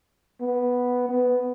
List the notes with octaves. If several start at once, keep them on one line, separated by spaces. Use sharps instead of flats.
B3
B3